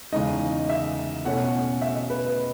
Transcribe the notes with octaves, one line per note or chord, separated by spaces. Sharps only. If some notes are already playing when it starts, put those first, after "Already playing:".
E2 C#3 G#3 D#4 D#5
E5
B2 A3 C#4 E4 F#5
E5
D#5
B4